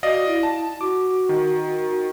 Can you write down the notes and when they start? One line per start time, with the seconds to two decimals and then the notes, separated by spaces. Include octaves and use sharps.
0.03 F#4 D5 D#5 F5
0.27 E4
0.43 A5
0.81 F#4 D6
1.29 D#3
1.88 F#4